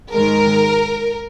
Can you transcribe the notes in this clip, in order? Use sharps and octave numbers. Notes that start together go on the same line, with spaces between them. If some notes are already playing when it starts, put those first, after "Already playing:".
G#2 D#3 G#3 A#4